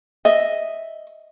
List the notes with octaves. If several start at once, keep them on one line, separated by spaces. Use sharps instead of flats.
D#5 E5